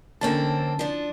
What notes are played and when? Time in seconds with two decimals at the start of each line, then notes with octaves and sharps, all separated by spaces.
0.21 F2 D3 A#3 C4 C#4 A5
0.79 F3 D4